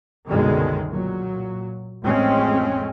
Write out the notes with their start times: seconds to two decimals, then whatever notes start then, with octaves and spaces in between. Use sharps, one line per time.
0.27 C2 F#2 B2 D3 D#3 G#3
0.92 A#2 F#3
2.03 A1 F2 G#3 C4 C#4